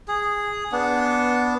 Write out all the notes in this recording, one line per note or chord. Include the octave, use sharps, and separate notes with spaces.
G#4
B3 D4